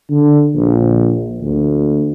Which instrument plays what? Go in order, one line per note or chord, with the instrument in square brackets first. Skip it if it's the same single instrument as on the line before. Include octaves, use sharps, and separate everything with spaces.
[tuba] D3
A#1
D2